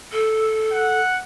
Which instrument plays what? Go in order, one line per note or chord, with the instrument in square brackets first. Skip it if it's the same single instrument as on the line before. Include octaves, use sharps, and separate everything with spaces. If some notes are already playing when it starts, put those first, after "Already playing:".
[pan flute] A4
[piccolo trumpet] F#5